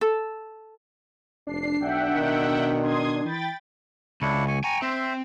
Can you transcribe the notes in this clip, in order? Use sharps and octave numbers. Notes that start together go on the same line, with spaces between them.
A4
F1 D4 C7
B1 E5 F#5 G5
B2 D#3
C6 D#6 G#6
E3 G5 B5 A6
C#2 D4 E4 C#6
G#5 C#6
G5 G#5 A#5 C#6
C4 C5 E5